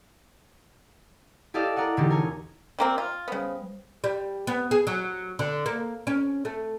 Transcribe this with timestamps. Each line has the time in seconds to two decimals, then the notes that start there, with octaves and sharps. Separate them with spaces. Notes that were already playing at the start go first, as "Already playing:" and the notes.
1.54 E4 G4 A4 D5 D#5 F5
1.76 A#4 D5 D#5 F#5
1.97 E1 D3 A3 D#4 G4
2.10 A#4 C#5 G#5
2.79 G3 A#3 C4
2.98 F4
3.28 C#3 G3 B3 C5
4.04 G3
4.47 B3
4.71 G#4
4.87 F#3
5.39 D3
5.66 A#3
6.07 C#4
6.45 A3